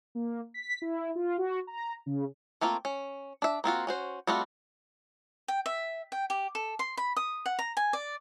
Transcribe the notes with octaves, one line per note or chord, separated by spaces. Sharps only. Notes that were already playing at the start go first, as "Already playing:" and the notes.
A#3
B6
E4
F4
F#4
A#5
C#3
A3 A#3 C4 F4
C#4
D4 E5
A#3 C4 F4 F#4
C#4 F#4 C5
G3 A3 C4 F4 F#4
G5
E5
G5
G4
A4
C6
B5
D#6
F#5
A#5
G#5
D5